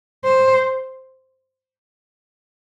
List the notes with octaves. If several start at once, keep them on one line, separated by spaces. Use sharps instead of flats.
C5